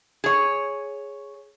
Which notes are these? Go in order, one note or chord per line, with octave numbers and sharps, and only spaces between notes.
G#4 C#5